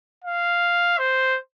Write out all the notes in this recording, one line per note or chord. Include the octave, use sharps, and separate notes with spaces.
F5
C5